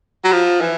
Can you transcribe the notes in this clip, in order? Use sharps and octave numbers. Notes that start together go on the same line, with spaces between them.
F#3
F3
E3